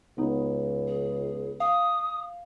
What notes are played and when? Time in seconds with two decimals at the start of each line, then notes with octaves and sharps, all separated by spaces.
0.18 C#2 B3 D#4
0.87 G#4
1.60 F5 D#6